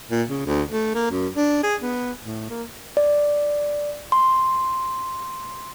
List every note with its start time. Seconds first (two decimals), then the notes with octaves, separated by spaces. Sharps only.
0.11 A#2
0.29 C#3
0.46 D2
0.71 A3
0.94 A#3
1.11 F#2
1.36 D4
1.63 G#4
1.81 B3
2.23 A2
2.50 A#3
2.97 D5
4.12 C6